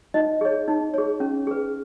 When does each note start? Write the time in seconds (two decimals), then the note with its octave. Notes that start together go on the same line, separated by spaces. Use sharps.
0.14 D#4 D#5
0.41 G#4 C#5
0.68 D#4
0.94 G#4 C#5
1.20 C#4
1.47 G#4 B4